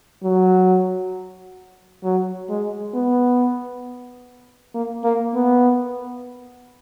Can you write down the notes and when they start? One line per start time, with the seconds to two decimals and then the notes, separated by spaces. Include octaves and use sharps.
0.23 F#3
2.04 F#3
2.49 G#3
2.94 B3
4.75 A#3
5.04 A#3
5.35 B3